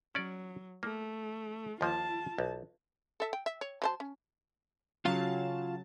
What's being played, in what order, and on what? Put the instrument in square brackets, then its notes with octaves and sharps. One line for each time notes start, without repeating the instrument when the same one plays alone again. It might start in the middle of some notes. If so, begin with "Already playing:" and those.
[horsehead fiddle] F#3 [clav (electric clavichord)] C#4 D5
[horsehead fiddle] A3 [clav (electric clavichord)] A#3
[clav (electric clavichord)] D#2 F3 A#3 [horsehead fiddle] F4 A5
[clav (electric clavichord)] B1
[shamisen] A4 E5
G5
E5
C#5
F#3 C5 A5
C#4
[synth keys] C#3 F#3 A5 [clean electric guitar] F4 F5